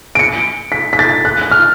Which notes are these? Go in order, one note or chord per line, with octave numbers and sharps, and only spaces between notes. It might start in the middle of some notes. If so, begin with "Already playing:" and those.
D7
C#7
B6
B6
A6
F#6
F#6
F6